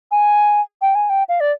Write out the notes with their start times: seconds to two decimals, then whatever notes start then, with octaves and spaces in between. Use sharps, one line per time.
0.11 G#5
0.82 G5
0.95 G#5
1.10 G5
1.29 F5
1.40 D5